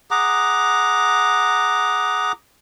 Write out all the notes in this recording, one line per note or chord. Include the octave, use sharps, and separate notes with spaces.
G#4 F#5 A#5 D6